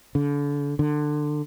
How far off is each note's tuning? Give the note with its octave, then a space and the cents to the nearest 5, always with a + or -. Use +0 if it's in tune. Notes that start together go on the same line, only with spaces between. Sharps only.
D3 -35
D3 +20